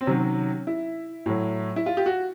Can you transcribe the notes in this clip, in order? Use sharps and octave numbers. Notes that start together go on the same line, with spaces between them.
C4
C3 D#3 F#3 C#4
E4
A2 F#3
E4
F4
G4
F#4